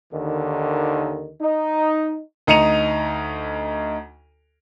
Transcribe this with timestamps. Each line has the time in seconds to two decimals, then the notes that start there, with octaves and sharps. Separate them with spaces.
0.12 D#2 D3 D#3
1.41 D#4
2.47 D2 D#4 A#5 C#7 D#7 F7